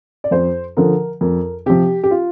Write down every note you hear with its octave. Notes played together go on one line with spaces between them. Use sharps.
D5
F2 C5
D3 F3 A#4
F2 A#4
C3 F3 G4
G4
F4